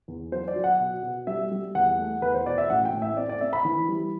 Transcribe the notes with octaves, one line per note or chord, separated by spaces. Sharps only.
E2
F#3 C5
D5
F#3
F#5
B2
B2
G3 E5
G3
E2 F#5
A3
E2 B4
C5
B2 D5
E5
A1 F#5
G5
A2
E5
C4 D5
D5
C4 E5
B5
E3
G3